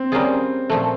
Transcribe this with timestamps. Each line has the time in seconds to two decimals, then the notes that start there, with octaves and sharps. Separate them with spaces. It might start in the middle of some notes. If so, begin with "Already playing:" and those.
Already playing: C4
0.12 G3 A#3 C#4 F4 G#4
0.70 A#2 F3 A3